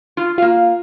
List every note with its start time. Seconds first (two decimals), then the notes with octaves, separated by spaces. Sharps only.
0.17 F4
0.38 A#3 F4 F5